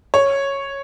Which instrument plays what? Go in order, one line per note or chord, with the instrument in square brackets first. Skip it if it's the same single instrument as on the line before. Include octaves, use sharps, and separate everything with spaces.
[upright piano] C#5